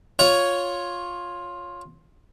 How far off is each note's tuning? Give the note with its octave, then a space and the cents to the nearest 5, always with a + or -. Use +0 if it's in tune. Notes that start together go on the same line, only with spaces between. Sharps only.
F4 +10 C#5 +0